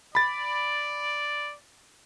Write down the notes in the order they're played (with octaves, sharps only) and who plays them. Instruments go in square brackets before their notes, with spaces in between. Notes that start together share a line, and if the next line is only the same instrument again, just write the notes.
[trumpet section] D5 [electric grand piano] B5 A6